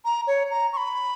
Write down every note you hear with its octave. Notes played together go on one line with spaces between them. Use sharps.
A#5
C#5
A#5
C#6
B5